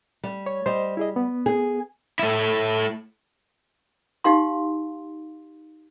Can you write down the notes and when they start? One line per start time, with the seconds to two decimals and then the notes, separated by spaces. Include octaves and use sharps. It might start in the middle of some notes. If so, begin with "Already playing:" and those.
0.23 G3
0.46 C#5
0.66 G3 C5 D#5
0.97 E4 G#4 D#5
1.16 B3
1.46 G#4
2.19 A3 E4
4.24 D#4 G4 F5 C6